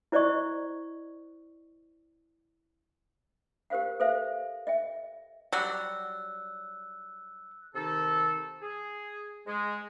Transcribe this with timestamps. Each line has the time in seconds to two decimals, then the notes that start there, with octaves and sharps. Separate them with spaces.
0.12 E4 C5 D5 D#5 C#6
3.70 G4 A#4 C5 F5 F#5
4.00 A4 B4 C5 E5 F5
4.67 D#5 E5 G5
5.53 F#3 G3 E6 F#6
7.75 C3 D#3 D#4 A4
8.62 G#4
9.46 G#3